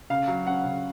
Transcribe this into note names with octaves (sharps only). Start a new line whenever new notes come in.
C#3 F5
F#3
C#4 F#5
C#3